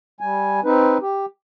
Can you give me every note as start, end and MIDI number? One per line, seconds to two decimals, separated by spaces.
0.21 0.60 55
0.21 0.60 80
0.64 0.98 60
0.64 0.98 63
0.64 0.98 71
1.01 1.26 67